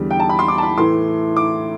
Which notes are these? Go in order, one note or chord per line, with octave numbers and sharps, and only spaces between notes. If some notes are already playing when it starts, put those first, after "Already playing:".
Already playing: E2 D3 G3
G5
A5
B5
C6
D6
A5
B5
A2 E3 A3 C6
D6